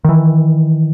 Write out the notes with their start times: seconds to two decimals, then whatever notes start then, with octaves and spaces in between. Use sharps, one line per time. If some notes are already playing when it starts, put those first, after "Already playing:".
0.05 D#3 E3